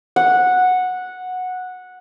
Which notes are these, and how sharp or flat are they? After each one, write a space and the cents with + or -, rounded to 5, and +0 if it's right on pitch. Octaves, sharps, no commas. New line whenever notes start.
F#5 -10